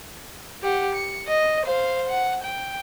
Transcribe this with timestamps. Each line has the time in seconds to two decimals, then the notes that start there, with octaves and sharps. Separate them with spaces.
0.63 G4 F#5
0.95 C#7
1.28 D#5
1.65 C5 F5
2.09 F#5
2.42 G5